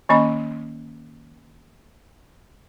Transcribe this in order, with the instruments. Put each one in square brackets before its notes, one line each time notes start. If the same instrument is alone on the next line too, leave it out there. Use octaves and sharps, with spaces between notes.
[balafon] D#3 A#3 C#4 D#5 B5